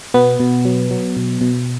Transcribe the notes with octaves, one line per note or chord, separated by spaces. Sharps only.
B2 B3
B2
F#3
F#3
B2
B2